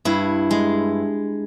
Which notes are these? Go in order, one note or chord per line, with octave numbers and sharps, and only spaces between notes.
G2 E4
G#3